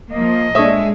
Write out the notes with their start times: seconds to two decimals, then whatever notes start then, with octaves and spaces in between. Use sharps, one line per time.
0.13 F3 A#3 D#5
0.55 A#2 G#3 D4 A4 C#5 E5 D#6